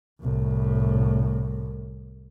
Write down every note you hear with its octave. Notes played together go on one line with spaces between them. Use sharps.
C2 A2